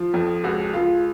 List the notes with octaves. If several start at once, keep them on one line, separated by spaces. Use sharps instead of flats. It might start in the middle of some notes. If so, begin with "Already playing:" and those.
Already playing: F3 F4
F2
C#2 F#4
C#2 F4